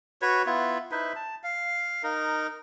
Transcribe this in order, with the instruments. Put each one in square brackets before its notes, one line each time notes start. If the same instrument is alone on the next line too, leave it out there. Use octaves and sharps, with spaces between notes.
[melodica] F#4 B4 C#5
B3 E4 F4
D#4 E4 B4 C5
A5
F5
D#4 A#4